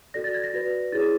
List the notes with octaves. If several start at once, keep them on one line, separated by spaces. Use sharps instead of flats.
F#4 A4 D5 A#6
A6
G#6
A#6
F#4 B4 D5
E4 G#4 C#5 A6